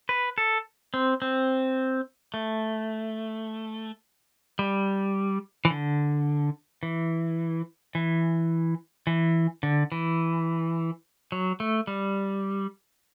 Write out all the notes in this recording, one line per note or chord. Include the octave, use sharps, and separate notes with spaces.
B4
A4
C4
C4
A3
G3
E3
D3
E3
E3
E3
D3
E3
F#3
A3
G3